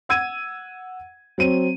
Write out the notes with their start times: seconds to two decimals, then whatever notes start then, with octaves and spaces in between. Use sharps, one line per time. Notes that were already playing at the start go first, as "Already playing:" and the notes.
0.09 F#5 E6 G#6 D#7
1.38 F#3 C4 D#7